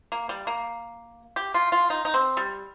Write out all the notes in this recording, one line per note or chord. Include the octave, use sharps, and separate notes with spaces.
A#3
G3
A#3
G4
F4
F4
D#4
D#4
C4
G3